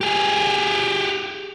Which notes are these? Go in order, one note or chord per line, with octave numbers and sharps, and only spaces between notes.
G4 G#4